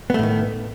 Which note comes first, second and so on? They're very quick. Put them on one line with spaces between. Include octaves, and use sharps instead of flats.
B3 A3 A2 D#3